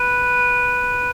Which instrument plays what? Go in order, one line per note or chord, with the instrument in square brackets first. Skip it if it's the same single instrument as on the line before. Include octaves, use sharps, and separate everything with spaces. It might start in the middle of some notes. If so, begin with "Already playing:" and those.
Already playing: [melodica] B4